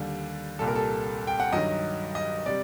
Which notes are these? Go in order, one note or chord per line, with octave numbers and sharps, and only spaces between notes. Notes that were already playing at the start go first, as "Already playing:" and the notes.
Already playing: D#2 D3 G3
C2 A#2 G3 A4
A#4
A4
G5
F#5
G2 D#3 F#3 D#5
D#5
C3 G3 D5